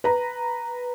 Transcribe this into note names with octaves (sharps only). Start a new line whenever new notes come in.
B4 A#5